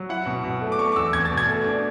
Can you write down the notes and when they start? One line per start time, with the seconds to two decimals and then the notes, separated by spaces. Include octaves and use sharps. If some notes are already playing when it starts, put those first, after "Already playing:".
Already playing: F#3
0.09 E4 F#5
0.26 B2
0.44 B2
0.61 A3
0.72 D6
0.79 A3 C#6
0.92 D6
0.96 E2 E6
1.13 E2 G#6
1.25 A6
1.31 B2
1.37 G#6
1.49 A3
1.66 D4